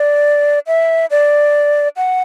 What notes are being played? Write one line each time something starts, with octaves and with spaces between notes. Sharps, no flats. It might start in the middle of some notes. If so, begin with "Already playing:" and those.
Already playing: D5
E5
D5
F#5